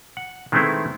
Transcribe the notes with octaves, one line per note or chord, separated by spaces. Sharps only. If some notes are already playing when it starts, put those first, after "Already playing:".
F#5
D#3 G#3 A3 B3 C4 E4